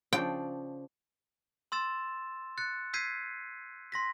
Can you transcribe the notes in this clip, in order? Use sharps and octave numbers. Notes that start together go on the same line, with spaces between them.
C#3 F3 D4 G5
C6 E6 A6 E7
F#6 A6 C#7
E6 G6 G#6 B6 C7 D#7
C6 A#6 B6